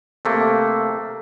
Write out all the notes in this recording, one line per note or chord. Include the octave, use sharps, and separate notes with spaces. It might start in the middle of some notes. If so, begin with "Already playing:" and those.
C3 A3 A#3